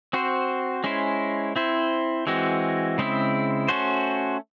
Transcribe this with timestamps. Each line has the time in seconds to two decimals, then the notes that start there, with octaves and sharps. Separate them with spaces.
0.13 C4 F#4 C5
0.84 G#3 C#4 E4 C5
1.56 C4 E4 C5
2.27 E3 G#3 C4 F#4
2.98 C#3 G#3 C4 E4
3.68 A3 C#4 F#4 C5